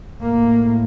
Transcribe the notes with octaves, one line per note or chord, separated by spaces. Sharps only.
A2 A#3